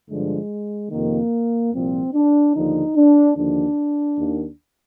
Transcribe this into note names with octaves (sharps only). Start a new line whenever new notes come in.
G2 D3 F3 G#3
F2 C3 D#3 A#3
C2 A#2 F3 C4
D4
D#2 D3 F3 D#4
D4
D#2 D3 F3 D4
D#2 D#3